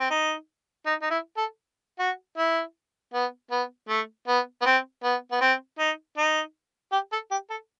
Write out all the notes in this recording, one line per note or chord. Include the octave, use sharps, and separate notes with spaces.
C4
D#4
D#4
D#4
E4
A4
F#4
E4
B3
B3
A3
B3
B3
C4
B3
B3
C4
D#4
D#4
G4
A4
G4
A4